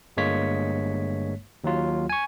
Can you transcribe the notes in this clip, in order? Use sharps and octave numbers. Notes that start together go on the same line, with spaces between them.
G1 G2 G#3 A#3 C#5 B6
D#2 F#3 F4
G#5 C#6